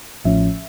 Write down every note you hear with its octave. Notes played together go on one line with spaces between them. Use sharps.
A1 A2 F3 C#4 E5